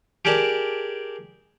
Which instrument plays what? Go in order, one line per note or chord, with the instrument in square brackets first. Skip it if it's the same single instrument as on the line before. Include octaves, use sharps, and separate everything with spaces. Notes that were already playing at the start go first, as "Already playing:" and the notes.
[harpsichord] G4 G#4 A#4 D5 A5